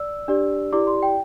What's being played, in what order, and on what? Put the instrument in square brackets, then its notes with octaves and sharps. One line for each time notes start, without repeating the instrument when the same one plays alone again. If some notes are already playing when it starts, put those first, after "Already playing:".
Already playing: [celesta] D5 E6
D4 G4 D5
E4 G4 D5 D6
C6
G5